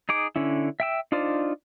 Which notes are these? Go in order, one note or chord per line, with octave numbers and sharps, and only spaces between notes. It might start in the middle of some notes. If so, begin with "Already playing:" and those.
D#4 G#4 D6
D3 C#4 E4
E5 G5 E6
D4 D#4 F4 C5 D5